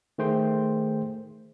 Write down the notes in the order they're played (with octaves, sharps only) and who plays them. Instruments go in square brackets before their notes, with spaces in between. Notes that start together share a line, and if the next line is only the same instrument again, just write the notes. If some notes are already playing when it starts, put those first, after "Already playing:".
[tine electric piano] D#3 A3 G#4 C5 G5 C6